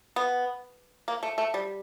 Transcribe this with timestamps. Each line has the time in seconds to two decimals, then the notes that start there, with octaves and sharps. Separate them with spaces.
0.16 B3
1.08 A#3
1.23 A3
1.38 A3
1.54 G3